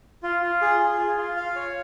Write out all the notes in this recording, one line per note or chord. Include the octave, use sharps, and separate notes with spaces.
F4
F4
G#4
G#4
F4
F4
F5
C#5